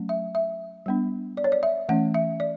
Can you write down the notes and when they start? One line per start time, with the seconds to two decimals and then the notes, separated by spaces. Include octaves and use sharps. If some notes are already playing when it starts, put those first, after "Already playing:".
Already playing: F#3 A3 C#4
0.09 E5
0.35 E5
0.86 G3 B3 D4
1.37 D5
1.44 C#5
1.52 D5
1.63 E5
1.89 E3 A3 C#4 F#5
2.14 E5
2.40 D5